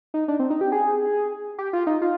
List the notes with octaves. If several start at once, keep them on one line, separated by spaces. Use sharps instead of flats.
D#4
D4
C4
D#4
G4
G#4
G4
F4
D#4
F4